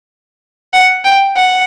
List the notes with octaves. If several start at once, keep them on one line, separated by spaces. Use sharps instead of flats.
F#5
G5
F#5